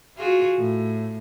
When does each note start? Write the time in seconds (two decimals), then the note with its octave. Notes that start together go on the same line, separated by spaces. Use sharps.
0.17 F4 F#4 G#4
0.57 A2